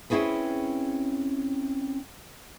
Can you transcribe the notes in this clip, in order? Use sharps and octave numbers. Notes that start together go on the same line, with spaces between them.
C4 C#4 E4 F#4 G#4 B4